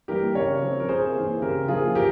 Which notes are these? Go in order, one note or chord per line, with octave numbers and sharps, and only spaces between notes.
E3 G3 A#3 G4 A#4
C#3 A#4 C#5
F3 C4
A#4
C3 G#4 C5
E3 A#3
C#3 G4 A#4
F3 A#3 F4 G#4
E3 G4 A#4